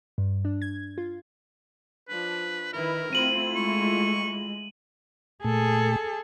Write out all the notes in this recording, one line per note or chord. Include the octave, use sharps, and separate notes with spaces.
G2
D4
G#6
F4
F3 D4 B4
D#3 E4 A#4 B4
A3 C4 E4 F4 D#7 F#7
G#3 C#6
A#2 A3 G#4 A4